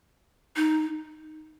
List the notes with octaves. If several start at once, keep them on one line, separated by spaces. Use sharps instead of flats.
D#4